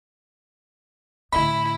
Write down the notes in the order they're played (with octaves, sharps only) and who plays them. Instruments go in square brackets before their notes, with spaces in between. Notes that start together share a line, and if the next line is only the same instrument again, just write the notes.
[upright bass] A2 D3 [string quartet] E4 [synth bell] B5